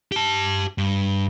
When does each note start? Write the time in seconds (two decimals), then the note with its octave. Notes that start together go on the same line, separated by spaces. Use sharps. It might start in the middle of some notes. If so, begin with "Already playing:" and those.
0.12 G4 A5
0.78 G2